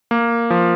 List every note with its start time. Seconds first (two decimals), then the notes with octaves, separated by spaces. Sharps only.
0.11 A#3
0.50 F3